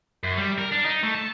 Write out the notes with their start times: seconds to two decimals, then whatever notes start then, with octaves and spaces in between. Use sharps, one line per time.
0.24 F#2
0.37 G3
0.58 A#4
0.71 D4
0.85 D#4
1.03 A3
1.15 A5